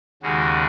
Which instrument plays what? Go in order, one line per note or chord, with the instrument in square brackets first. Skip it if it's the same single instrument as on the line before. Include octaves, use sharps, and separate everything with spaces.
[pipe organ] D#2 C#3 G#3 F#4